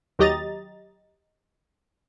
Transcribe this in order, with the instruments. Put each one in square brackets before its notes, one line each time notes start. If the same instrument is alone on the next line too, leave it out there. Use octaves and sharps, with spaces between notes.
[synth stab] D#2 F#3 G4 D#5 A#5 A6